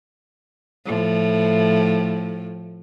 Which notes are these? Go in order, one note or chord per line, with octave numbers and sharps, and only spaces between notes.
A2 F3